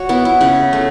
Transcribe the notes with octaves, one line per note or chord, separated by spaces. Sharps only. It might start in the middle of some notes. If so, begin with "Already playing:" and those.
Already playing: F#4 C#5
B3 E4
E4
C#3
A3